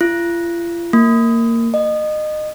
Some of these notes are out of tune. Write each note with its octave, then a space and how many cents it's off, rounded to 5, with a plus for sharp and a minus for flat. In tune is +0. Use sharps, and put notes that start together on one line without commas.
F4 -40
A#3 -20
D#5 -25